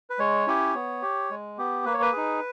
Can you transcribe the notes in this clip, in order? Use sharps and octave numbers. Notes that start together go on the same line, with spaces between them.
B4
G#3 C#5
C#4 E4 G4
B3
G4
G#3
B3 G4
A#3 B4
C#5
B4
D#4 G#4